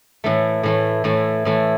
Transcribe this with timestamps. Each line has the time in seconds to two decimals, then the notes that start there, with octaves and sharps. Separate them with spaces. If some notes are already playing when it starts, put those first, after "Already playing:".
0.24 A2 E3 A3
0.63 A2 E3 A3
1.04 A2 E3 A3
1.45 A2 E3 A3